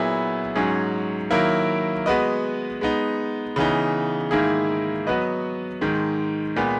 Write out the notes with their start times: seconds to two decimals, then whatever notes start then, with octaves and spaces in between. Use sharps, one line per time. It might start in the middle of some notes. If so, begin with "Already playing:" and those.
Already playing: A#2 F#3 B3 E4 G#4
0.55 G#2 F#3 C#4 G#4
1.31 D#3 F#3 A#3 E4 A#4
2.06 G#3 B3 F#4 B4 D#5
2.81 G#3 B3 D#4
3.56 C#3 E3 B3 D#4
4.31 G#2 D#3 A#3 E4 G#4
5.07 F#3 B3 F#4 B4 D#5
5.81 G#2 D#3 G#3
6.56 A#2 G#3 B3